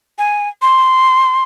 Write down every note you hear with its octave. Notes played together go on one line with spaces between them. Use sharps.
G#5
C6